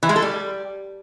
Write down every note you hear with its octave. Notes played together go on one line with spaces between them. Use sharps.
E3
G#3
A4
G3